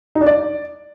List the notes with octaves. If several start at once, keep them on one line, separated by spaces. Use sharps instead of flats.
D#4
D4
D5